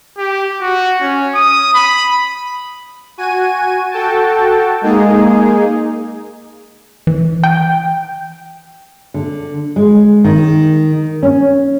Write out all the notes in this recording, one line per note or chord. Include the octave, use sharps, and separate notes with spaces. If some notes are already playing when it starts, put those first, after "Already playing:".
G4
F#4
C#4
D#6
B5
F#4 G#5 D#7
F#4 A4 G5 A5
G#3 A#3 D#4 G#4
E3
G5
D3
G#3
D#3
C#4